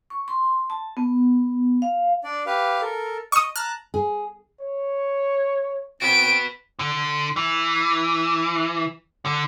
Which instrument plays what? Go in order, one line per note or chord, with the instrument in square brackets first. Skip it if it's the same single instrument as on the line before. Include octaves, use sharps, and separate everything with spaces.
[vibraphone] C#6
C6
A5
B3
F5
[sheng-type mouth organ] D4 D5
G4 B4 F5
A4 A#4
[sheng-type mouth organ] D#5 [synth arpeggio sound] C#6 D#6
[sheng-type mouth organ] A5 A#5 F#6 [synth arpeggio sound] F6
[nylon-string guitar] G#4
[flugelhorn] C#5
[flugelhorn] C4 [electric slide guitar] F#4 B4 [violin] D7
[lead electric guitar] D3
E3
D3